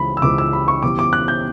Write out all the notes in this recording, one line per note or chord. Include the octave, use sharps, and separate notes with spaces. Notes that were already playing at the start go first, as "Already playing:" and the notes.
Already playing: C#2 C#3 E3 B5
E6
C#2 C#3 E3 D6
E6
B5
C#6
E2 C#3 E3 G3 D6
D6
F#6
G6